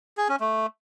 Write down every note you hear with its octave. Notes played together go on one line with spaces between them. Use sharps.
G#4
C#4
A3